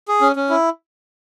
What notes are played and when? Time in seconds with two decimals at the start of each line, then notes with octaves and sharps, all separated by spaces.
0.08 G#4
0.21 C#4
0.36 C#4
0.50 E4